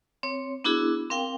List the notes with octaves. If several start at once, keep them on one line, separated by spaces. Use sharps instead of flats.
C4 C#5
B3 D4 E4 F#4 G#4
C4 A#4 F5 G5